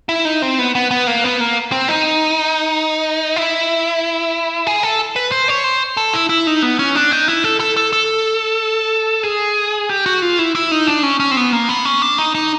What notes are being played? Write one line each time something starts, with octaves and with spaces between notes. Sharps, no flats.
E4
D#4
C4
B3
B3
B3
A#3
B3
A#3
C4
D#4
E4
G#4
A4
B4
C5
C#5
C5
A4
E4
E4
D#4
B3
C#4
D4
D#4
E4
A4
A4
A4
A4
G#4
G4
F#4
F4
E4
E4
D#4
D4
C#4
C#4
C4
B3
A#3
B3
C#4
D4
D#4
D#4